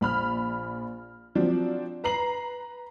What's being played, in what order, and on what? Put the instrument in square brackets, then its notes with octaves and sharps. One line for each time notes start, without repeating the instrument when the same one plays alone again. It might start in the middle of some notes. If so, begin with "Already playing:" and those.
[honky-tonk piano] A#1 B5 F6
F3 F#3 C4 D4
B4 A#5 C7 F#7